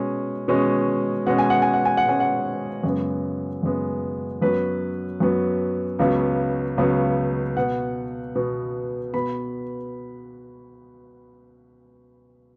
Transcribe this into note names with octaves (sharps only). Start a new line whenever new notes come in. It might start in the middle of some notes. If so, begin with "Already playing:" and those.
Already playing: B2 G#3 C#4
B2 G#3 C#4
B2 G#3 C#4 F#5
G#5
F#5
G#5
F#5
G#5
F#5
B2 G#3 C#4 G#5
F#5
F#2 C#3 G#3 B3
F#2 C#3 G#3 B3
F#2 F#3 B3 B4
F#2 F#3 B3
C#2 C#3 F#3 B3
C#2 C#3 F#3 B3
B2 B3 F#5
B2 B3
B2 B3 B5